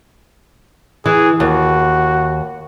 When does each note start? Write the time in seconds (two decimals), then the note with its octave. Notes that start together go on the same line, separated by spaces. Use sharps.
1.06 E3 G#4
1.40 D#2 F#4